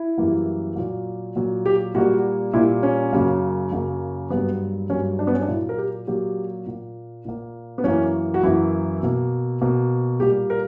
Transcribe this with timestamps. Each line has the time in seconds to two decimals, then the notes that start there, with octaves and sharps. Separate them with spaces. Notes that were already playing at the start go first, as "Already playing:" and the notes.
Already playing: E4
0.18 F#2 E3 G3 A#3
0.76 A#2 F#3 A#3
1.36 A#2 F#3 A#3
1.66 G4
1.95 A#2 G3 A#3 F#4
2.53 A#2 G3 A#3 E4
2.83 C#4
3.13 F#2 C#3 F#3 A#3
3.71 F#2 C#3 F#3 A#3
4.30 G2 F#3 A#3 B3
4.90 G2 F#3 A#3 C#4
5.19 D4
5.27 B3
5.34 C#4
5.41 D4
5.48 A#2 F#3 A#3 E4
5.69 A#4
5.78 G4
6.07 A#2 F#3 A#3 G4
6.66 A#2 A#3
7.25 A#2 A#3
7.78 B3
7.84 F#2 E3 A#3 C#4
8.34 F#4
8.43 F#2 E3 A#3 E4
9.02 B2 A#3
9.61 B2 A#3
10.20 A#2 G3 A#3 G4
10.50 A#4